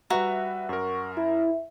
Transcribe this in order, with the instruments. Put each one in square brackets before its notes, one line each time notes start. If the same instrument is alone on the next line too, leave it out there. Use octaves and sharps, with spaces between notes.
[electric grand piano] G3 B4 E5 [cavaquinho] F#4 A#5
[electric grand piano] F#2 A#4 [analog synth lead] C#6
[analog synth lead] E4 [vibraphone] E5